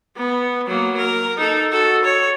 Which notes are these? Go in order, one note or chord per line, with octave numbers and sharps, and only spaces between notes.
B3
F#3 A#3
A#4
D#4 A4
F#4 A4
C#5